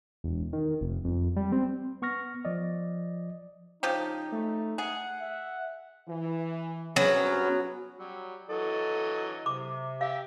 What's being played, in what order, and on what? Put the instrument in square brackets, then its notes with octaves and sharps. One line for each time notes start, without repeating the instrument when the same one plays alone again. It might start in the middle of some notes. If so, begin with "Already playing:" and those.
[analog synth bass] E1
D#3
F1
F2
G3
C4
[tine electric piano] B3 C#6 F6 A#6
F3 D5 D#5
[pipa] C#3 F3 G4 [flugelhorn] D#4
[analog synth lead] A3
[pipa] G#4 [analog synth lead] F#5
[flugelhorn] E5
[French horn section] E3
[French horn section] G2 C3 G#4 [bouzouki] F#3 [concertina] B3 C#4
[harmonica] F#3 G3
[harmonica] E3 F#3 D#5 [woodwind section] A4
[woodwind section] C3 [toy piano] D6
[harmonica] G4 E5 [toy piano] F5